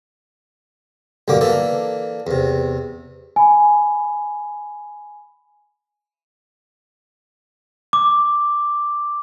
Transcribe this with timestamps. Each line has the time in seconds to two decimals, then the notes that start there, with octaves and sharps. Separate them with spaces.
1.28 B1 G2 D3 A#3 D6
1.41 E3 A#3 D4 A4
2.27 E2 C3
3.36 G#5 B5
7.93 D6